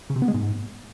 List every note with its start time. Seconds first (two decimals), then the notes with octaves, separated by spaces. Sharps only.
0.10 C#3
0.16 C3
0.22 B3
0.28 G#3
0.34 G#2